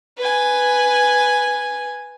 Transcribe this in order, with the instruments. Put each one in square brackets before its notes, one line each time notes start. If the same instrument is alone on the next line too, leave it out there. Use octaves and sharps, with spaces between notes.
[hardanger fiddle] B4 G#5